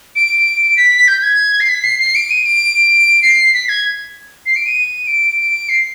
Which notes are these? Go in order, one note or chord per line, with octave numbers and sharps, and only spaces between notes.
D7
B6
G6
G#6
C7
B6
C7
C7
D7
D#7
D7
C7
B6
G#6
C7
D7
D#7
D7
C7